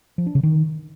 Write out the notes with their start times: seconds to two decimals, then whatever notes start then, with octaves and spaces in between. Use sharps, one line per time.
0.18 F3
0.26 D4
0.35 C#3
0.43 D#3